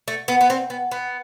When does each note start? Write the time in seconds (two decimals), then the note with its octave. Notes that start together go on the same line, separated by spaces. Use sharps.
0.08 A3
0.28 B3
0.41 B3
0.50 C4
0.70 B3
0.91 B3